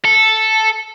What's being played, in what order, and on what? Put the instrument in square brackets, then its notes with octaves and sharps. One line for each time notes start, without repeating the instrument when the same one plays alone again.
[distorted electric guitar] A4